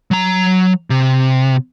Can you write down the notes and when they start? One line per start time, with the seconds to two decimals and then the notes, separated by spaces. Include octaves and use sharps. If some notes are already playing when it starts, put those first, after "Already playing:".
0.11 F#3 A#5
0.90 C3